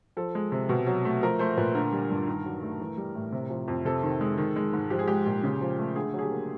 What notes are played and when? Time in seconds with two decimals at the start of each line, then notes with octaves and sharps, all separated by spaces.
0.17 F3 A4
0.35 G#3
0.52 C3
0.69 B2
0.87 F#3
1.05 A3
1.23 F3 A#4
1.39 A3 C5
1.57 A#2 B4
1.74 D3 A#4
1.93 G3
2.10 G2
2.27 D#3
2.45 F#3
2.62 A3
2.81 E3
2.97 G3
3.15 A2
3.32 C3
3.50 F3
3.68 F2
3.85 C3 A4
4.03 D#3
4.21 G#3
4.38 D#3
4.56 G#3
4.73 G#2
4.90 F3 G4
4.99 G#4
5.08 G#3 G4
5.26 A#2
5.44 C#3
5.61 F3
5.79 A3
5.96 D3 G#4
6.13 F#3
6.19 G#4
6.22 G4
6.31 A#3